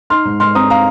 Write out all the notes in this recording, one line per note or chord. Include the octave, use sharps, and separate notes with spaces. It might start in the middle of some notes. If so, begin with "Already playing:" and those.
D#4 C6 F6
G#2
G#2 C6 F6
C4 A#5 D#6
F5 A#5